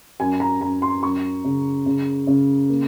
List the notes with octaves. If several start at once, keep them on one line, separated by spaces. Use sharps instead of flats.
F#2 G#5
A#5
F#2 A#5
C6
F#2 C#6
C#3
C#3
C#3
A#3